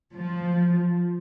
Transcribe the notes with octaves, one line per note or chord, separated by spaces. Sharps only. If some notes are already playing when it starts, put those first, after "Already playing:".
F3